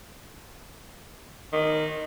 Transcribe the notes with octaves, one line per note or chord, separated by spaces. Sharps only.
D#3